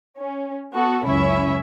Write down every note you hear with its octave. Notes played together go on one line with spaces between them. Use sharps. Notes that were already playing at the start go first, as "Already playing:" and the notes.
C#4
B3 F#4 A4
C#2 F#2 C#4 E4 E5